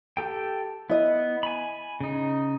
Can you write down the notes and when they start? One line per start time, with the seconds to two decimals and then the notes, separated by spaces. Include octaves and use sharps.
0.17 G4 A4 G5
0.90 B3 E4 D#5
1.43 G#5 B5
2.00 C#3 D#4